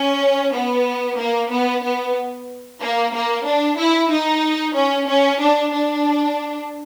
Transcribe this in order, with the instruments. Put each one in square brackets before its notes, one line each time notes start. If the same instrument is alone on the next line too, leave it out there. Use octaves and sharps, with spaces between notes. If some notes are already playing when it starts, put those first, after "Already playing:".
Already playing: [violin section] C#4
B3
A#3
B3
B3
A#3
A#3
D4
E4
D#4
C#4
C#4
D4
D4